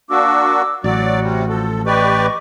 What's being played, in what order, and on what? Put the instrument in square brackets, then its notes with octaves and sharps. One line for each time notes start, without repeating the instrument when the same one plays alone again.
[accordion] A#3 D4 F#4 [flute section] D6 E6
[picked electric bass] A1 [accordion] F#3 D5 [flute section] F#4
[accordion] C3 G3
F3 A4
[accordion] G4 B4 D5 [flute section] D#5 C#6 D6